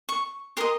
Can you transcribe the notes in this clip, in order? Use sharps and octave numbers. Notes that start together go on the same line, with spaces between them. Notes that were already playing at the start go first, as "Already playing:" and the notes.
C#6
G4 A#4 D#5 C6